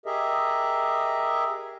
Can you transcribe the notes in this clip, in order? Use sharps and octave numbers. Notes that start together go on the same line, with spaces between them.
G4 G#4 A#4 D#5 E5